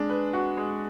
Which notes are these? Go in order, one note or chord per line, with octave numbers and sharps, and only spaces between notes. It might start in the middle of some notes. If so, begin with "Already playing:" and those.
Already playing: G#3 D4
B4
F#4
G#3